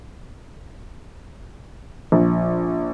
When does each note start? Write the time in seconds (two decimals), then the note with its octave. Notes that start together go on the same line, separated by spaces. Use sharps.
2.12 A#1